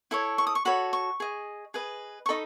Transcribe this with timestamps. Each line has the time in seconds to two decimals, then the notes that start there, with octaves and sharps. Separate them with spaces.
0.11 E4 A4 C#5
0.38 C#6
0.47 D#6
0.55 C#6
0.65 F#4 A4 C#5 B5
0.93 C#6
1.20 G#4 D#5
1.74 G#4 B4 D#5
2.26 C#6
2.29 D#4 A4 D#5 B5